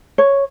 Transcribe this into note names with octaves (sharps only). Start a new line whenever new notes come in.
C#5